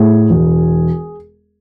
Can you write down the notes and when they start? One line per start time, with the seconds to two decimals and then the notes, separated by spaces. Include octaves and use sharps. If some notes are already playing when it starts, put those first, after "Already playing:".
Already playing: A2 G#4
0.30 E1